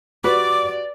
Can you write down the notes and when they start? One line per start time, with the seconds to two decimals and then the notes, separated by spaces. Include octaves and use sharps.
0.24 F#4 G4 B4 D5 D6